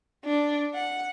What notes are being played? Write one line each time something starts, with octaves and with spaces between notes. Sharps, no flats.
D4
F#5